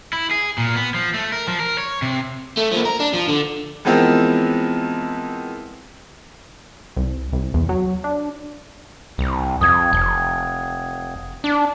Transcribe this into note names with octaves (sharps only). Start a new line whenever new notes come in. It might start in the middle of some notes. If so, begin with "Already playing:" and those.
E4
G#4
A#2
B3
F3
A3
A#4
F3
A#4
C#5
C3
A3
F3 A#3
A#4
D4
F3
D3
E3 F3 G#3 B3 C4 A#4
C2
C2
E2
F#3
D4
C2
F2 D#6 G#6
F1
D4